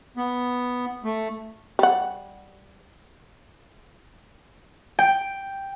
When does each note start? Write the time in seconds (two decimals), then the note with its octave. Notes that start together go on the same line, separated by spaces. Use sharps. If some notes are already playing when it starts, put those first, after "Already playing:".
0.17 B3
1.04 A3
1.79 G3 F#5
4.99 G5